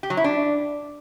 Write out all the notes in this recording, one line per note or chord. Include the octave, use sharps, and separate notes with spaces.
G4
F#3
E4
D4